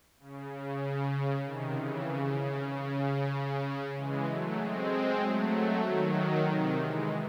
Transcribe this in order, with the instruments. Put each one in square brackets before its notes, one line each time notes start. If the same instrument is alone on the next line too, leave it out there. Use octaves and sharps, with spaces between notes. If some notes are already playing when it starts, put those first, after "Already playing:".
[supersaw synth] C#3
C#3
C3 D#3
C#3 E3
C#3
C#3
C#3
E3 G#3
F#3 A3
G#3 C4
F#3 A3
D#3 F#3
C3 D#3
E3 G#3